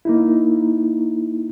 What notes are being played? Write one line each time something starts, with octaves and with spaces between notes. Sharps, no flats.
A#3 D#4 E4